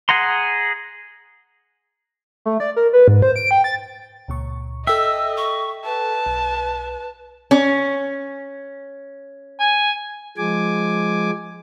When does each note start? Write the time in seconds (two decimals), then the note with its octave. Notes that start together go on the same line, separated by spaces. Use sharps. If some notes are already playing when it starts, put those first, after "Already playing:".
0.09 G#4 F#5 A#5 C6
2.46 A3
2.60 D5
2.76 A#4
2.93 B4
3.08 G#2
3.22 C5
3.36 D7
3.51 G5
3.64 A6
4.28 C#2 A#2 C#6
4.87 A4 D#5 E5 G5 E6
5.37 C#6
5.85 B4 A5
6.26 B1
7.51 C#4
9.60 G#5
10.37 F3 G#3 G#5 D6